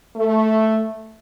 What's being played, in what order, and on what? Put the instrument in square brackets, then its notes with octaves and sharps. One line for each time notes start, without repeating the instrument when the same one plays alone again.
[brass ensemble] A3